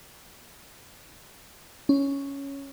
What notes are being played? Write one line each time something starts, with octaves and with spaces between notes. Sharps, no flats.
C#4